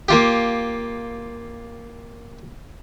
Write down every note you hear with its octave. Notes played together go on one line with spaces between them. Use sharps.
A#3 F4 G4